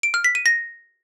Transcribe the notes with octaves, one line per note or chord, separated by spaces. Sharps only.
D7
F6
B6
D#7
A#6